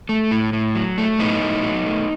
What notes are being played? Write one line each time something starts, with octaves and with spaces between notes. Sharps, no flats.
A3
A2
A2
F#3
A3
A2 B3 D#4
A2
F#3
A3